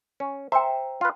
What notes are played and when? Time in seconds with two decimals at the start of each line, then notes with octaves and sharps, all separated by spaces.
0.20 C#4
0.52 C5 E5 G5 A#5
1.01 F4 B4